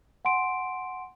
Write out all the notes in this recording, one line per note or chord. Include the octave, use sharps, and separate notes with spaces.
F#5 G#5 C6 D7